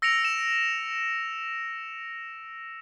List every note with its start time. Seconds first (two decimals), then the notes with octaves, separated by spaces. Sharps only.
0.02 E6 A#6 C#7 D7 F7
0.25 E7